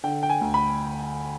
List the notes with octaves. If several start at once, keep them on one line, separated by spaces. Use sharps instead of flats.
D3 G5
G5
G#5
D2
B5